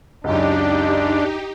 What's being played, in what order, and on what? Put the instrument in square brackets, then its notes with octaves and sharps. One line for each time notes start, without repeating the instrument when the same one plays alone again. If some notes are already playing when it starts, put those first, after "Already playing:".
[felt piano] C#2 F#2 [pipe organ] D4 [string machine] D#4 G4